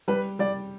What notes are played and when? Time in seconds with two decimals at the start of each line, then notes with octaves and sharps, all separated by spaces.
0.08 G3 B4
0.39 G3 D5